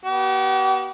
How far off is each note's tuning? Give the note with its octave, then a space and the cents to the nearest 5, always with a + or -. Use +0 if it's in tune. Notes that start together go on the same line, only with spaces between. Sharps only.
B3 -25 G4 -45